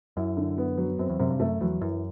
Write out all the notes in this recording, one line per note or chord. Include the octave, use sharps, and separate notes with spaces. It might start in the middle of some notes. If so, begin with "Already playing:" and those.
F#2 E4
D3
B3
F#3
F#2 C4
E2
F#2 C3
G2
F#2 A3
E2 F#3
F#2 E3